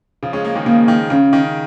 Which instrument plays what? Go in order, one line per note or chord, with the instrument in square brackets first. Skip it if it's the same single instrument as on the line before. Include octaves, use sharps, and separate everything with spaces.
[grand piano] C#3 F3
G#3 C#4
F3 A#3
D#3 G#3
[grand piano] C#3 F3 [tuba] A#3
[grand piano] D#3
[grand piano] C#3 [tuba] C#4
[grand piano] D#3